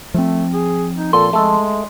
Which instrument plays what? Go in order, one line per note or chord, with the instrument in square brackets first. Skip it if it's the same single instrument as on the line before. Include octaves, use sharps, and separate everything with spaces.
[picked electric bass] F3 C4 [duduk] A3
[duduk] G#4
D#4
[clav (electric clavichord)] A#2 [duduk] A4 [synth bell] C6
[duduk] G#3 [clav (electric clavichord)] A3 A4